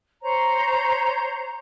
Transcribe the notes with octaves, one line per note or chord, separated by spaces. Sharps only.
C5 C#5 A#5